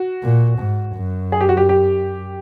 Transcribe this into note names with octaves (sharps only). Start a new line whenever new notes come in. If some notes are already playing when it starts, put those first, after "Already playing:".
Already playing: F#4
A#2
G#2
F#2
G#4
G4
F#4
G4
G4